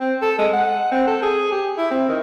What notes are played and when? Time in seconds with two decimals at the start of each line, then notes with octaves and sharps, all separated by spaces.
0.01 C4
0.22 A4
0.39 G#3
0.53 F#5
0.92 C4
1.07 A4
1.22 G#4
1.52 G4
1.78 E4
1.91 C4
2.09 D#3